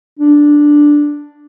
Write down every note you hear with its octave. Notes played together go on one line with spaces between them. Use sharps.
D4